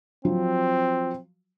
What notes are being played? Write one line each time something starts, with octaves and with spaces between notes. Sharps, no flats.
F3 F#3 C4